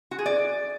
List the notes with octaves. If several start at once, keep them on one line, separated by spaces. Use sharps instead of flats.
F#4
G#4
D5